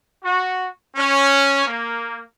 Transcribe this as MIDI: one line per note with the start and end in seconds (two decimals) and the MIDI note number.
0.23 0.67 66
0.95 1.62 61
1.66 2.19 58